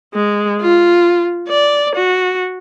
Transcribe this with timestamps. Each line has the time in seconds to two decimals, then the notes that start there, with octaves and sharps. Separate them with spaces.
0.14 G#3
0.61 F4
1.49 D5
1.95 F#4